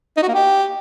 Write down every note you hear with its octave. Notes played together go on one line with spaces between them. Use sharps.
D#4
F#4
A#3
G4